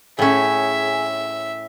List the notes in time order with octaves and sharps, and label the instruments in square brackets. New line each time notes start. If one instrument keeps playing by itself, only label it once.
[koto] A2 C#4 [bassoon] G#4 [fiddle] E5